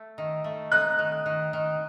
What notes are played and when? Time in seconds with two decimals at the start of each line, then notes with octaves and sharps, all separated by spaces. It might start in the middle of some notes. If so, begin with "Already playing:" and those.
Already playing: A3
0.18 D#3
0.44 A3
0.72 D#4 F#6
0.99 D#3
1.26 D#3
1.53 D#3